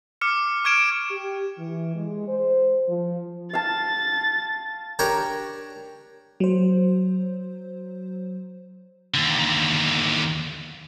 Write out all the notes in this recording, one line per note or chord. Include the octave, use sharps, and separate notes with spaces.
D6 F6 C#7
C#6 F6 G#6 D7 E7
G4
E3
G#3
C5
F3
F5 A5 A6
D4 G4 A#4 C#5
F#3 C5
D#2 D3